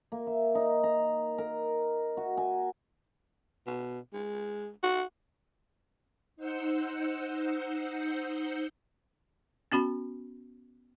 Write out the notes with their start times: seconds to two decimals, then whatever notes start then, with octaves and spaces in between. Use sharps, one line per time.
0.12 A#3
0.27 E5
0.55 D#4
0.83 A#5
1.38 A#4
2.17 F#4
2.37 G#5
3.67 B2
4.14 G#3
4.83 F#4
6.36 D#4 C5 F#5 E6 G6 C#7
9.72 B3 C#4 F#4 B5